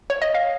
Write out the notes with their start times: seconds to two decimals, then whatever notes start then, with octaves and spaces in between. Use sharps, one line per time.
0.10 C#5
0.22 D#5
0.35 F5